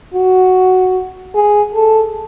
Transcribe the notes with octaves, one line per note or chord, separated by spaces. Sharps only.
F#4
G#4
A4